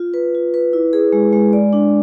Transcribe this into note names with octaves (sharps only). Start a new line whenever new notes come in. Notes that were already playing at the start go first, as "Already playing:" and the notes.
Already playing: F4
B4
F4
B4
E4
G#4
G#3
G#3
D5
D4